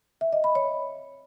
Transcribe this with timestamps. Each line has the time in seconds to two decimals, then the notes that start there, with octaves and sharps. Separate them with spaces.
0.21 E5
0.33 D#5
0.44 B5
0.55 C#5